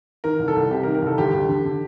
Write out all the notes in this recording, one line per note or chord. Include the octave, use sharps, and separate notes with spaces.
D#3 A#4
C2
A4
C2
C3 G4
A#4
D#3
A#4
C2 A4
D2 G4
D2
D3
D3